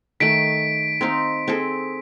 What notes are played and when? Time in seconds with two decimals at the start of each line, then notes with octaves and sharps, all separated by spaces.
0.20 D#3 A3 B6 D7
1.01 C4 D#4 F5
1.48 C4 G#4 A4